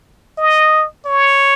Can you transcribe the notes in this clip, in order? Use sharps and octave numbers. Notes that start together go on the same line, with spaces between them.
D#5
C#5